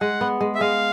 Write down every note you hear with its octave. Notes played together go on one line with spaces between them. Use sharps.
G#3 F#5
B3
G#3
E5
G#3 F5